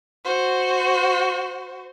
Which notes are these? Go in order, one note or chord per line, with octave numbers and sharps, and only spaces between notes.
F#4 C5